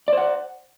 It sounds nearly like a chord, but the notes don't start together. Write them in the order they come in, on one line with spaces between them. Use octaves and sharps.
D5 C5 F#5